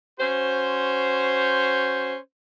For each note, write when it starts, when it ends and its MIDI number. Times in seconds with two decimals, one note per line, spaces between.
0.19 2.16 61
0.19 2.16 66
0.19 2.16 72